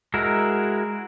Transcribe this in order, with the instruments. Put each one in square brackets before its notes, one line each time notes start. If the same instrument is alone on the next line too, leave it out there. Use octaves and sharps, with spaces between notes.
[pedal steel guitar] G#3 E4 F#4 A#4